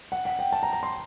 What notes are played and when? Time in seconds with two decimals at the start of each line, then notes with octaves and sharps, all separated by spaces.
0.12 F#5
0.25 F#5
0.39 G5
0.52 A5
0.63 A#5
0.73 A#5
0.83 C6